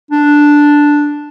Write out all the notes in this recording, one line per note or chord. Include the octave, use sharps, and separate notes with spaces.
D4